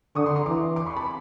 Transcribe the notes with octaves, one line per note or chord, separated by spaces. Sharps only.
D3 C#6 D#6
C6 D6
A#5 C6
E3 C6 D6
C6 D6
B5 C#6
A5 B5